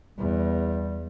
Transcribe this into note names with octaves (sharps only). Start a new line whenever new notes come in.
E2 G3